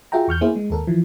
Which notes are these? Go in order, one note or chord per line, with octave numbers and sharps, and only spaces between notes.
F4 F#4 G#4 E5 G5 A#5
E2 C#6 F6 G6
A#3 B3 E4 G#4 C5
G#3
D#2 A4 A#4
E3 F3